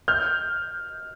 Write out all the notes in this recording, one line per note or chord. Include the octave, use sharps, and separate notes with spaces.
F6 G6